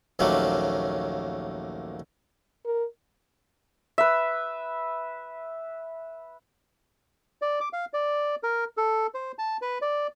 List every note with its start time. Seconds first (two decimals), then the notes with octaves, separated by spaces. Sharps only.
0.19 A#1 D#2 C#3 F#3 A3 A#3
2.65 A#4
3.98 B4 E5
7.42 D5
7.60 D6
7.73 F5
7.93 D5
8.43 A#4
8.77 A4
9.14 C5
9.39 A5
9.62 B4
9.82 D5